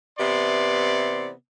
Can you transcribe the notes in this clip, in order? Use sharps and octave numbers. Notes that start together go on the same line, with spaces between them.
C3 E3 B3 D5 C6